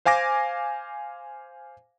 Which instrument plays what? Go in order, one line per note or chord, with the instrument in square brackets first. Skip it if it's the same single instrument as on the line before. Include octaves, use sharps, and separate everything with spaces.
[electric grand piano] C5 F5 G#5 D6 A#6